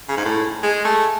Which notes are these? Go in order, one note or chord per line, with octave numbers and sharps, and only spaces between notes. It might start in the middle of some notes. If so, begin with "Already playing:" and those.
C#3
G#2
A2
G#3
A3